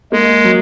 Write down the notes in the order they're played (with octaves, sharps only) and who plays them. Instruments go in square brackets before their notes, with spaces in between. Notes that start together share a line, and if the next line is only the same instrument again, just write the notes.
[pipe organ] G#3 [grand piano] A#3
[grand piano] F#3